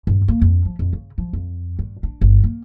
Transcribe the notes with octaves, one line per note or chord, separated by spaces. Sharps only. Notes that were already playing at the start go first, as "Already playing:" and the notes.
G2
A#3
F2
F3
F2
C#3
F3
F2
G2
D4
G1
A#3